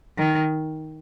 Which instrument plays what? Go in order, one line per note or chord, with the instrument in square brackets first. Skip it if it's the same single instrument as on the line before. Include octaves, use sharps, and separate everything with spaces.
[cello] D#3